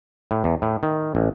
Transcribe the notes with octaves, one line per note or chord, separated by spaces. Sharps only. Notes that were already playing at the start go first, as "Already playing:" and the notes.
A2
E2
A2
D#3
A1